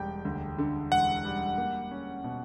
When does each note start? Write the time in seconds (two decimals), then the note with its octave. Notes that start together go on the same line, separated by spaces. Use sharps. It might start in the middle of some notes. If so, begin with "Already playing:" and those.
Already playing: E1 G3 G5
0.25 D2
0.58 D3
0.92 E1 F#5
1.25 G3
1.58 A#3
1.91 C#4
2.24 B2